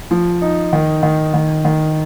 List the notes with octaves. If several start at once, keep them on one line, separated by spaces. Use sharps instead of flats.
F3
D#4
D#3
D#3
D#3
D#3